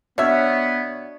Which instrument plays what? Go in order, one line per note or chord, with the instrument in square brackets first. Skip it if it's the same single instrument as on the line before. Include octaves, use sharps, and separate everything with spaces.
[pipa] B2 E5 [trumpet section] B3 [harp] D4 F6 [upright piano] C#5